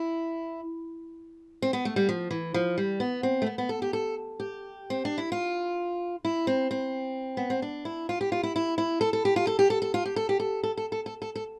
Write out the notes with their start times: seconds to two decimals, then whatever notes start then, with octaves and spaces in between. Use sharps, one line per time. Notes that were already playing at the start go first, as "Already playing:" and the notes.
Already playing: E4
1.62 C4
1.73 B3
1.85 A3
1.96 G3
2.09 F3
2.31 E3
2.54 F3
2.78 G3
3.00 B3
3.23 C4
3.42 A3
3.46 B3
3.58 B3
3.69 A4
3.82 G4
3.93 A4
4.40 G4
4.90 C4
5.05 D4
5.18 E4
5.32 F4
6.25 E4
6.47 C4
6.71 C4
7.37 B3
7.50 C4
7.62 D4
7.85 E4
8.09 F4
8.21 G4
8.32 F4
8.43 E4
8.56 E4
8.78 E4
9.01 A4
9.13 A4
9.25 G4
9.36 F4
9.47 A4
9.59 G4
9.70 A4
9.82 A4
9.94 F4
10.06 G4
10.16 A4
10.29 G4
10.40 A4
10.63 A4
10.78 A4
10.92 A4
11.06 A4
11.22 A4
11.36 A4